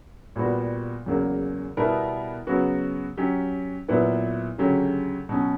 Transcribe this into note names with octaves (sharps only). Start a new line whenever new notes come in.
A#2 G3 B3 F#4
E2 C#3 F#3 A#3
B2 G3 B3 E4 A#4
C#3 F#3 B3 F#4
F#3 C#4 G4
A#2 F#3 B3 E4 B4
D2 C#3 F#3 C#4 G4
B2 F#3 C#4